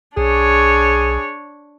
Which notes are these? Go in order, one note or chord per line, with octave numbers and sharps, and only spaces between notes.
B1 D4 G#4 C#5